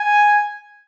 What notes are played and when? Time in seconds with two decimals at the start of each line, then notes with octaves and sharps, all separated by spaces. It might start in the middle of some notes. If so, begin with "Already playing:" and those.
Already playing: G#5